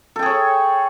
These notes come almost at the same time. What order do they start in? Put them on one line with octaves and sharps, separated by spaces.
A4 G5 G#4 C#5